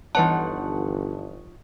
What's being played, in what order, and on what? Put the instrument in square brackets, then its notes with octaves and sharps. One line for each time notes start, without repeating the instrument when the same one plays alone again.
[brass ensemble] G1 [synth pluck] E3 B4 F#5 [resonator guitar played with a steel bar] F3 D#4 C#5 [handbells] A5